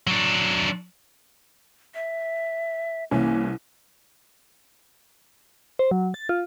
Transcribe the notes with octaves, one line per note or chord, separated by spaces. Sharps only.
F#3 D4
E5
C2 E3 A#3 C#4
C5
F#3
A6
F4